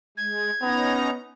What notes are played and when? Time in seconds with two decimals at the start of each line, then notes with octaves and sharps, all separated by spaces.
0.17 G#3 G#6
0.61 B3 C#4 D#4 A#5